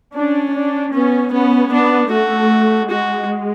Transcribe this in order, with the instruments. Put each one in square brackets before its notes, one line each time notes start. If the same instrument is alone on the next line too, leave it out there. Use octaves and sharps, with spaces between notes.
[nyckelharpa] C#4 [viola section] D4
[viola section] D4
[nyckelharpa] B3 [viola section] C#4
[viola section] B3 [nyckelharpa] C#4
[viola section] B3 [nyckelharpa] D4
[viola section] A3 [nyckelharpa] F#4
[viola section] G#3 [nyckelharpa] F#4